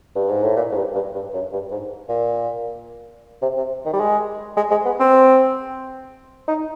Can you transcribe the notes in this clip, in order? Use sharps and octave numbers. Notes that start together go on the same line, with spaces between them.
G2
G#2
A2
A#2
G#2
G2
G2
G2
F#2
G2
G#2
A#2
C3
C3
D#3
G3
G#3
G#3
G#3
B3
C4
D#4